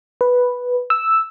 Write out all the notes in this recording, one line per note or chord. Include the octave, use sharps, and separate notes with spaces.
B4
E6